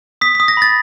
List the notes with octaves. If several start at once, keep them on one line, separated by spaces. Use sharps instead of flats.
D#6 B6
D#6 B6
A#6
B5 A6